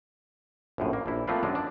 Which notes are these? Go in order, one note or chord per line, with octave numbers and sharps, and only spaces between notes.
A#1 F#2 A2
A#3
A#1 E4
F3 A3 A#3 C4 F4 B4
F#2 G#3 D4
D4